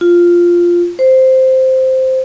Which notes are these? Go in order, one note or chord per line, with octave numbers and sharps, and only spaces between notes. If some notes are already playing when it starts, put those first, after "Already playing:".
F4
C5